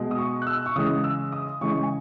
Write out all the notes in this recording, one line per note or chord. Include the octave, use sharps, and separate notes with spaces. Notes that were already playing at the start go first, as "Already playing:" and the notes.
Already playing: B2 G#3
D#6
C#6
F#6
E6
C#6
C#3 E3 G#3 D#6
E6
D#6
C#3 E3 G#3 C#6
G#5